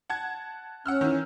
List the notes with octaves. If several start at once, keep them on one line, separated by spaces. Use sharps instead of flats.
F#5 A5 G#6
C#4 F#5 E6 F6
D#3 E3